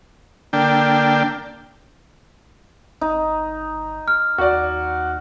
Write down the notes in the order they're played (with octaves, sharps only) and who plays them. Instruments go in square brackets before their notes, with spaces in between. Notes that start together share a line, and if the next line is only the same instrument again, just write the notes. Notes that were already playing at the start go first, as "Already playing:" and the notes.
[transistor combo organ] D3 A#3 D4 G5
[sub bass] G1 [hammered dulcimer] D#4
[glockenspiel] F6
[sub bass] D#2 [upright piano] F#4 D5